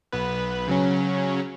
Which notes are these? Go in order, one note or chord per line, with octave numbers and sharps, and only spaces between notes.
B1 B3 B4
C#3 F#3 C#4